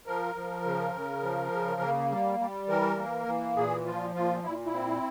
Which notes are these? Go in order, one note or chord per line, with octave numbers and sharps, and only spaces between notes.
F3 A#4
F3
C#3
C#3
F3
C#3
A#3
G3
G3
E3 A#4
A#3
E3
A#2 G#4
F3 F4
A#2 F4
A#2 E4
E4
C4